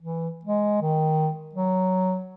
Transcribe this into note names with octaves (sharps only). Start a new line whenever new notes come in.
E3
G#3
D#3
F#3